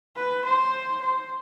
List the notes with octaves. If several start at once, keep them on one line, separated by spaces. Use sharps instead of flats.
B4
C5
C5